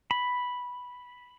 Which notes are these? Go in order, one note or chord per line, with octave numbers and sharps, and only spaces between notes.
B5